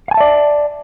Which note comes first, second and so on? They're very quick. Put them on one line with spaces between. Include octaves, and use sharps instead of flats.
F5 G#5 A5 E5 D5